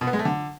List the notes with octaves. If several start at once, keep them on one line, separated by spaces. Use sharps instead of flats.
B2
B3
G#3
A3
D3